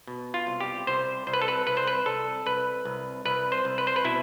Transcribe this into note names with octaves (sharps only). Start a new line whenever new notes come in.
B2
F4
C2
G4
C2 C5
C2 C5
B4
A4
B4
C2 B4
C5
B4
C2 A4
C2 B4
C2
C2 B4
C5
C2
B4
C5
B4
B2 E4